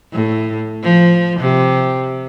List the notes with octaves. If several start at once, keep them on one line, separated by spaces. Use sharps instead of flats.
A2
F3
C3